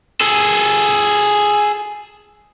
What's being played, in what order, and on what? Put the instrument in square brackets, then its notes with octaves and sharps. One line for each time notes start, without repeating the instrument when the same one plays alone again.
[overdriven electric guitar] G#4 A4